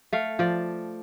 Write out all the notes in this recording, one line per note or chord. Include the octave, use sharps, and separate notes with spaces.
A3 F5
F3 D5